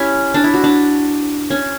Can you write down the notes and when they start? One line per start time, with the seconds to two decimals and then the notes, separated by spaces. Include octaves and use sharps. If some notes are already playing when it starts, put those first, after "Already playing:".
Already playing: C#4 E4 G4
0.34 D4
0.44 E4
0.54 F#4
0.64 D4
1.50 C#4